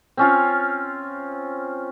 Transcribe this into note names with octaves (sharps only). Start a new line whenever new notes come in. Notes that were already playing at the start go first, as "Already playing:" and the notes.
C4 C#4 F4